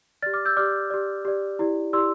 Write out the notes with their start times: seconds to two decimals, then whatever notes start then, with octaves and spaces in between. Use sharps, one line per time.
0.22 G4 D5 F6 A6
0.34 D6 F6
0.45 E6 G6
0.57 G4 D5 D6 F6
0.90 G4 D5
1.25 G4 D5
1.59 E4 G4 D5
1.93 E4 G4 D5 C6 E6